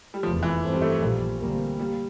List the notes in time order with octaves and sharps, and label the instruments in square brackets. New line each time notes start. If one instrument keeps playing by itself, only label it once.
[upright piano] G3
[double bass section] F1 E2 E3 A3 [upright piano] F3
[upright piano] E3
[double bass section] G2 E3 A3 C4
[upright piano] G3
A3
A3
[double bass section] A#1 A#2 F3 A#3 [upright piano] G3
[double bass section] D2 C3 G3 A#3
[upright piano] G3 [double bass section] A#3